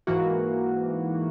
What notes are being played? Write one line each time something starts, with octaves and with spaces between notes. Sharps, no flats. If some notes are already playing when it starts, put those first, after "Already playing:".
G#2 E3 A#3 F#4